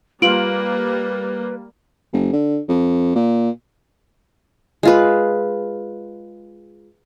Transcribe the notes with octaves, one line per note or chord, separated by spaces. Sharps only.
G3 A#3 F4 B4 D7 F#7
F#1
D3
F2
A#2
G#3 F4 B4